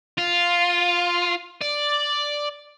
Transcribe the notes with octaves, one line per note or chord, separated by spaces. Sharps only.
F4
D5